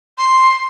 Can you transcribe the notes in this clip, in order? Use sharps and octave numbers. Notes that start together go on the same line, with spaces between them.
C6